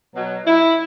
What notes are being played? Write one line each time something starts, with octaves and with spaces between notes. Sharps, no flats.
B2 F#3
E4